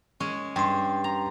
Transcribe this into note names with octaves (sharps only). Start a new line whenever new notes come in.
G#3 C#4
G2 G5 C6
A#5